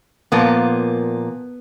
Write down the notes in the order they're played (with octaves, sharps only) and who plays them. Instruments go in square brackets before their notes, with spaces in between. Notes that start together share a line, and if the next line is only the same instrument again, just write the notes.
[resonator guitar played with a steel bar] A#2 F3 A#3 B3